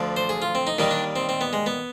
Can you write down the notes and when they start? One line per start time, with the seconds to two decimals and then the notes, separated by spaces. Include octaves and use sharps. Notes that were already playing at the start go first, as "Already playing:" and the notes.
Already playing: D2 D3 F3
0.17 C5
0.29 G#4
0.42 F4
0.55 C4
0.67 D#4
0.78 D#2 D#3 G3 D#4
0.91 D4
1.16 C4
1.29 C4
1.41 B3
1.53 G#3
1.66 B3